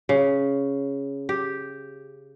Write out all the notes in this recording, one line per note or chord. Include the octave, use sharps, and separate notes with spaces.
C#3
G4